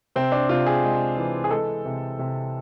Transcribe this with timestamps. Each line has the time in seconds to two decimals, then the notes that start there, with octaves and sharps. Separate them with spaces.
0.16 C3 C4
0.32 D4
0.49 C3 F4
0.66 G#4
0.83 G#3
1.17 E3
1.44 G#4
1.51 G#3 A4
1.85 C3
2.19 C3